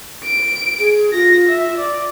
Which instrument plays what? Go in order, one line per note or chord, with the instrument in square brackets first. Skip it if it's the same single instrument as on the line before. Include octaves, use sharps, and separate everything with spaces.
[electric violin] D7
[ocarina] G#4
[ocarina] F4 [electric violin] A#6
[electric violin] E5
D5